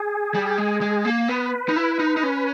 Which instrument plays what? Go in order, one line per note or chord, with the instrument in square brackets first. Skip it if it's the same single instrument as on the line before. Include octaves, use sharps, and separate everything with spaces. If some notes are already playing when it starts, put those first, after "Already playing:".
Already playing: [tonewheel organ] G#4
[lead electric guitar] G3
G#3
G#3
A#3
[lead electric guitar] B3 [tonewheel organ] B4
[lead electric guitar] D#4
E4
D#4
D#4
C#4